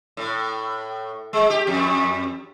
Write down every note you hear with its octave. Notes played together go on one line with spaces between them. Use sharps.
A2
G#3
G4
F2